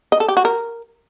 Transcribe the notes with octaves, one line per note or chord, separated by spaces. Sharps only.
D#5
A4
G4
F#4
A#4